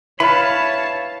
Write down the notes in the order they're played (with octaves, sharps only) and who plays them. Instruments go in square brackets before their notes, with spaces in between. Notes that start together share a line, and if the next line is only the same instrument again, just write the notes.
[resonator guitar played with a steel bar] E4 B4 [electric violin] C#5 A5 [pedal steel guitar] F5 B5